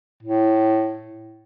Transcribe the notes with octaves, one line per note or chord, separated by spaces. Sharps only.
A2